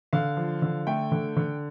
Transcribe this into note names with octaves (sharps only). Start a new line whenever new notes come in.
D3 F5
F3
D3
A3 G5
D3
D3